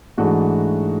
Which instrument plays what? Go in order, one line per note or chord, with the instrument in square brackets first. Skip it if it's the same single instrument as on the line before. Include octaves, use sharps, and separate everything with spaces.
[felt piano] G#2 E3 A3 D4 F#4